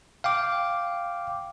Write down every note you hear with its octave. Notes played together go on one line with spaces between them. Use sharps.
F5 G5 D6